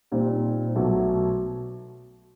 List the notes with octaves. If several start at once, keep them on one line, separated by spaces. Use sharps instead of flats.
A#2 G3 C4 D#4
B1 B2 F#3 A3